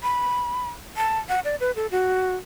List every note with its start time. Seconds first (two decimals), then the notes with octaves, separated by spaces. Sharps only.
0.03 B5
0.97 A5
1.29 F#5
1.45 D5
1.60 B4
1.76 A4
1.91 F#4